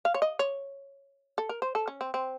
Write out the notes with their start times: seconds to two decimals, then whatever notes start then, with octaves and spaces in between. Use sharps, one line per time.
0.05 F5
0.14 C#5
0.22 D#5
0.39 C#5
1.38 A4
1.49 A#4
1.62 C5
1.75 A4
1.88 C#4
2.01 C4
2.14 C4